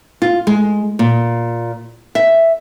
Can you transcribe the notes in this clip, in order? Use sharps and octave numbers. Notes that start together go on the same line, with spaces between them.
F4
G#3
A#2
E5